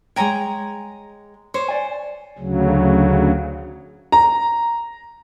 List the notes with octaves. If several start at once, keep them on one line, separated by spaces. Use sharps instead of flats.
G#3 C#5 G5 G#5 A#5
C5 C#5
D5 G#5
D2 C#3 F#3
A#5